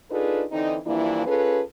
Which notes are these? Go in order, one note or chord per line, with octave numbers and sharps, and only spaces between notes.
D4 D#4 F4 G#4 A4 B4
D3 E3 C4 D#4
G2 E3 F3 A#3 D4 E4
C#4 F4 G#4 A4 B4